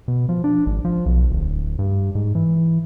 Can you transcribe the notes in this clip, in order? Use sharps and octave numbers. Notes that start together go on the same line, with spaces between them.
B2
F3
D4
G#1
F3
B1
D1
G2
G#2
E3